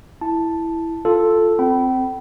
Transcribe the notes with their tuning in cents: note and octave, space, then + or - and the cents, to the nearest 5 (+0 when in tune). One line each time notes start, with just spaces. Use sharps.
E4 +0 A5 +0
F4 +0 A4 +0
C4 -5 G5 -35 B5 +0